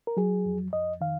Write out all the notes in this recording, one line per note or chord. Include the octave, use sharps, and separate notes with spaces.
A#4
F#3 G#4
F2
F2 D#5
D#3 F5